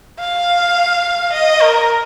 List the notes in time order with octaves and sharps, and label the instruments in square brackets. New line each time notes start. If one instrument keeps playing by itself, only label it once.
[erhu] F5
D#5
A#4